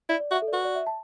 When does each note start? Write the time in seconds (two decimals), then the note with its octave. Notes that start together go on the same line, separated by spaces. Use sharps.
0.09 E4 D5
0.20 D5
0.31 F#4 E5
0.42 A4
0.48 D5
0.53 F#4 B4
0.65 D5
0.75 E5
0.86 A5